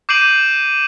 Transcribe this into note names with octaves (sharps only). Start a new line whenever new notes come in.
D6 G6 C7 D7 D#7 F#7